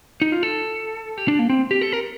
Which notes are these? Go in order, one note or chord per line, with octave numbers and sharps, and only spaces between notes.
D#4
F4
A4
G4
D4
A#3
C4
G4
A4
A#4